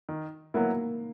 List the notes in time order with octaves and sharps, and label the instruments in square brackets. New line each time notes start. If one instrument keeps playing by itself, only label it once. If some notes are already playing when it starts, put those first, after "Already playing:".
[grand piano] D#3
[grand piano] F#3 B3 E4 [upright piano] A#3